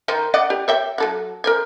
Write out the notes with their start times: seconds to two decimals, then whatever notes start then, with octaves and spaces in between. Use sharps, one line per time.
0.08 D#3 D#4 C5
0.34 D5 D#5 F#5
0.50 G4
0.68 C#5 E5 G5
0.98 F#3 A4 F#5
1.44 A#4 C5 G#5